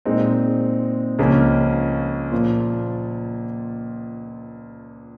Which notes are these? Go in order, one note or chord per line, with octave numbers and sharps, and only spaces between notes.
A#2 G#3 C4 D#4
C#2 C#3 F3 A#3 C#4
A#2 F3 A#3 F4